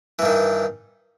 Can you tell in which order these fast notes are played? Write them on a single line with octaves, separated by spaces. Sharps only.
E3 G2 D#3